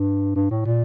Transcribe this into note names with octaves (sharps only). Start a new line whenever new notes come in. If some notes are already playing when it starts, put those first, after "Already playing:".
Already playing: G2
G2
A2
A#2